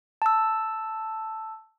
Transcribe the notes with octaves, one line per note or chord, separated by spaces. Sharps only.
A5 E6